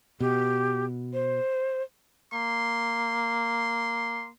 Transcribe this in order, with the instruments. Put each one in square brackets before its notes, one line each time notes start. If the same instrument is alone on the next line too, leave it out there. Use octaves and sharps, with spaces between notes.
[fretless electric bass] B2 [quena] G4
[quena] C5
[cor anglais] A#3 [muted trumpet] C6